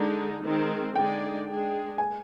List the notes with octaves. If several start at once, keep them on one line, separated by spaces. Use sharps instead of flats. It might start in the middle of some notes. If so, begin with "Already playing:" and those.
Already playing: D3 G#3 D#4 A#5
D#3 G#3 C4
D3 G#3 D#4 G#4 D5 G5
G#3 D4 G#4
G#5